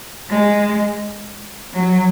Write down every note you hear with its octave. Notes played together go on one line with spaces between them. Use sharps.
G#3
F#3